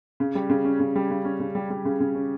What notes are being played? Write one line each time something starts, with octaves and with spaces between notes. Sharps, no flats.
C#3
G3
C#3
C#4
C#3
G3
C#3
C#4
C#3
G3
G3
C#3
C#3
C#4